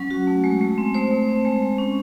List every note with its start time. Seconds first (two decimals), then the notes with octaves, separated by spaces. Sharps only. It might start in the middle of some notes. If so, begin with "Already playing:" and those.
Already playing: F#3 C#4
0.10 F#4
0.27 A3
0.44 G#3
0.61 G#3
0.78 C4
0.94 A3 C5
1.11 A3
1.29 C4
1.45 G#3
1.62 G#3
1.78 C#4